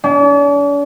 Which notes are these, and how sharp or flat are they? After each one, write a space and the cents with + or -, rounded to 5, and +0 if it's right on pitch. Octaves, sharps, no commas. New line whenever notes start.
D4 -45